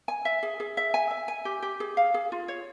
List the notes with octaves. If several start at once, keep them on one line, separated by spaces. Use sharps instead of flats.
G#5
E5
G#4
G#4
E5
G#5
E5
G#5
G4
G4
G#4
F5
G#4
F4
C#5